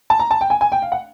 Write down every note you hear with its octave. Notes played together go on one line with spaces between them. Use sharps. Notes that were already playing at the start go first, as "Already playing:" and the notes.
A5
A#5
A5
G5
G#5
G#5
G5
F5
F#5